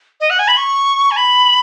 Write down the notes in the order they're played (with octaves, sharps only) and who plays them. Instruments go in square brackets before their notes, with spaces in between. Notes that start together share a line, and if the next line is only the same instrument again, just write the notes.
[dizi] D#5
F#5
G#5
B5
C#6
G#5
B5